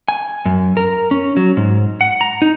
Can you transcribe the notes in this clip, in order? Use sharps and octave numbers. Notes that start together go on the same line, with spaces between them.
G#5
F#2
A#4
C#4
F#3
G#2
F#5
A#5
D#4